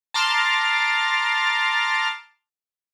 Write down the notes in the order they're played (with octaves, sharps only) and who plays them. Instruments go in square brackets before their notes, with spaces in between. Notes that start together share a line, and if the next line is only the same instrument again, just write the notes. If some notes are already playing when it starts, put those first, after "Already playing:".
[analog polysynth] A5 A#5 C6 D6 F6 A6